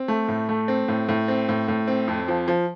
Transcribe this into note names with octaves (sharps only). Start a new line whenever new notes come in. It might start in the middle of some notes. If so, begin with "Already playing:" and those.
Already playing: C4
A3
A2
A3
C4
A2
A2
C4
A2
A2
C4
F2
F3
F3